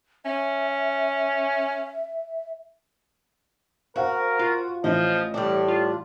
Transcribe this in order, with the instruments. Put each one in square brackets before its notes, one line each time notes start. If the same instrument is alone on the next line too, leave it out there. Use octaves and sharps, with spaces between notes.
[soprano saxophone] C#4 [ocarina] E5
[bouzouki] F#4 [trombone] A#4 [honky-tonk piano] C5 F5 F#5
[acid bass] F4 [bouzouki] F#4
[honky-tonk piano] A1 E3 E5 [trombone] F3 [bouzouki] D#5
[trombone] A2 [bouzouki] G3 D4
[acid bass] F4